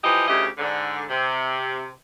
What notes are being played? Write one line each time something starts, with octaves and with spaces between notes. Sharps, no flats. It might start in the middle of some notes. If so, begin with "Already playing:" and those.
E3 F3 G4 D#5
D2 C#3 E4 G4 D#5
G#2 D3
C3